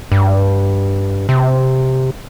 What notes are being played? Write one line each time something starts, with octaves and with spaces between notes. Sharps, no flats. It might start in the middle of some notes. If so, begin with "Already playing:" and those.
G2
C3